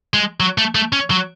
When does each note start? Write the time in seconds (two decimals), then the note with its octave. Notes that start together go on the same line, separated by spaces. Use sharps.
0.14 G#3
0.40 F#3
0.58 A3
0.75 A3
0.93 C#4
1.11 F#3